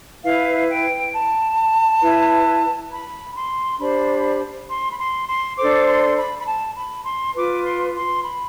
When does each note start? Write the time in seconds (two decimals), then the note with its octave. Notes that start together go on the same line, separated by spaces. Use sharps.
0.24 E4 B4 F5
0.68 G5
1.13 A5
2.02 E4 B4
2.91 B5
3.35 C6
3.79 D4 G4 C5 B5
4.68 C6
4.90 B5
4.98 C6
5.28 C6
5.57 D4 A4 C5 D6
5.87 C6
6.17 B5
6.38 B5
6.46 A5
6.76 B5
7.05 C6
7.35 F4 B4 D6
7.65 C6
7.95 C6
8.24 B5